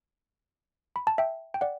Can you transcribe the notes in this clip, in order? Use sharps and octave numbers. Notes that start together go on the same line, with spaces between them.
B5
A5
E5 G5
G5
D5 F#5